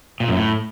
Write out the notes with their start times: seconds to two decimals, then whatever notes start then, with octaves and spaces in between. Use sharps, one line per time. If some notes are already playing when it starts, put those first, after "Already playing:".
0.20 A#2
0.28 F#2
0.36 A2